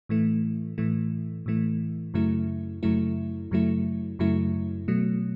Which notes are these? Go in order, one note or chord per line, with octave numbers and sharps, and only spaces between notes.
A2 E3 A3
A2 E3 A3
A2 E3 A3
F#2 C#3 F#3 A3 E4
F#2 C#3 F#3 A3 E4
F#2 C#3 F#3 A3 E4
F#2 C#3 F#3 A3 E4
B2 F#3 A3